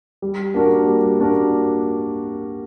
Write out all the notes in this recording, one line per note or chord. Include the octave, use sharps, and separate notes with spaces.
G3
A#3 D4 F#4 A#4
G3
A#3 D4 F#4 A#4